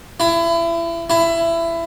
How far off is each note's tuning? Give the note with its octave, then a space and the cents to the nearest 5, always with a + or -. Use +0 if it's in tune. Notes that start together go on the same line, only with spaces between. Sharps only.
E4 +30
E4 +20